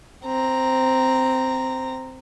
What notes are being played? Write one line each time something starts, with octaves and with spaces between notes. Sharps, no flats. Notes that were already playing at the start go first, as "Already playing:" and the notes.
C4 A#5